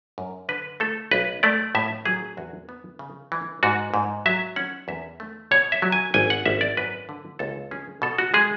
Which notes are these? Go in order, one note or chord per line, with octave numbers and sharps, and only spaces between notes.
F#2
D3 B4
A3 A4
B1 B4
A3 D5
A2 E5
F#3 G#4
E2 F#4
B3
C#3
E3
G#2 F#4
G#2
F#3 E5
C#4 F#5
E2 E5
A3
B2 C#5
E5
F#3
G#5
G#1 G#5
F#5
G#1 E5
D5
F#2 B4
D3
C#2 A4
C#4 G#4
B2 A4
F#4
G#3 G#4